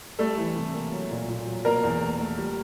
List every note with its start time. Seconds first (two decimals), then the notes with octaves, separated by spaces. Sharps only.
0.19 G3 A3 A4
0.37 E3
0.56 C3
0.74 A#3
0.92 F#3
1.11 A#2
1.29 A#2
1.46 F#3
1.65 B2 A#3 A#4
1.83 E2
2.01 A3
2.19 A3
2.38 G3